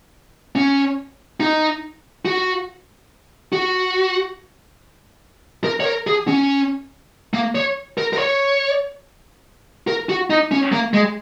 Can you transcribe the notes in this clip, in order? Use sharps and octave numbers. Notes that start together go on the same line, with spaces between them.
C#4
D#4
F#4
F#4
A#4
C#5
A#4
G#4
C#4
A#3
C#5
A#4
A#4
C#5
A#4
F#4
D#4
C#4
A#3
G#3